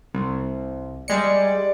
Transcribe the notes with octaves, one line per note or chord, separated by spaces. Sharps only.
C2
G3 G#3 D5 C#7